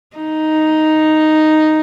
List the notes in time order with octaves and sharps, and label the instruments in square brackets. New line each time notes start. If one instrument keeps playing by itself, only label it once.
[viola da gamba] D#4